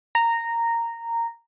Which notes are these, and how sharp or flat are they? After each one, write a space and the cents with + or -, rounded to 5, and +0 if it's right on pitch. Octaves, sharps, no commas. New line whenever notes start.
A#5 -10